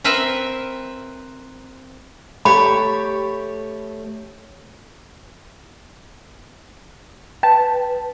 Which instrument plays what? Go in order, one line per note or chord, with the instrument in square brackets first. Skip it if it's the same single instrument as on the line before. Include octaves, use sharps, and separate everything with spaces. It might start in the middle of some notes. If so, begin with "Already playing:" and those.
[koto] C4 A#4 B4 E5 A#5
[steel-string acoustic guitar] A3 G4 C#5 [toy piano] B5
[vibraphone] B4 [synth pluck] G5 A5